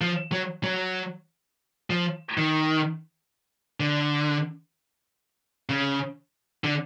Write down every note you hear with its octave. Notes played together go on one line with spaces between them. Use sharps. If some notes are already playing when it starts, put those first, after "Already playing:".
F3
F#3
F#3
F3
D#3
D3
C#3
D3